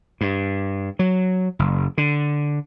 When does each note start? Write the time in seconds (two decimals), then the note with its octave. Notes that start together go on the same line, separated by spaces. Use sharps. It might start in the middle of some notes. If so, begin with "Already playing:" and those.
0.21 G2
0.99 F#3
1.59 F#1
1.98 D3